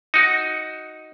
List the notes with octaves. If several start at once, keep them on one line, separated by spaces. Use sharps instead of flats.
D#4 F#4